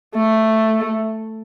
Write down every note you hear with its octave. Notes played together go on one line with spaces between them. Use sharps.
A3